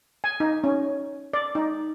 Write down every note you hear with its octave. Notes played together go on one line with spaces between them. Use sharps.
G#5
D#4
C#4
D5
D#4